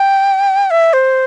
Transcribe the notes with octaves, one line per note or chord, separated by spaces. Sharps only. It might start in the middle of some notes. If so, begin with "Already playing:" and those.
Already playing: G5
E5
C5